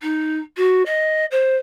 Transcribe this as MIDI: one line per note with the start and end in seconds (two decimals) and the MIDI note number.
0.01 0.38 63
0.57 0.82 66
0.86 1.25 75
1.31 1.56 72